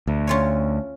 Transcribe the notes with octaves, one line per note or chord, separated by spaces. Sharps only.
D2
C#4 F4 C#5